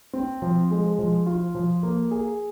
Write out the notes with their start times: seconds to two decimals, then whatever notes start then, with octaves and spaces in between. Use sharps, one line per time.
0.13 C4
0.42 F3
0.71 G#3
0.99 F3
1.27 F4
1.55 F3
1.83 A#3
2.11 G#4